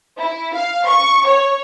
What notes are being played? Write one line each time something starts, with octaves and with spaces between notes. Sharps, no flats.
E4
F5
C#6
C#5